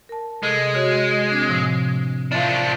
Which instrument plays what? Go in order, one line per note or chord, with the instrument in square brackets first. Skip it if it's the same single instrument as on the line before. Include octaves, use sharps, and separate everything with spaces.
[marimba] A#4 A5
[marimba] C3 A4 D#6 [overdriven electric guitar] G#3
[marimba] F#4 C#5 F6
C4 D4
A2 C3 F3
[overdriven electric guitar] F3 D4 [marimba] E5 F5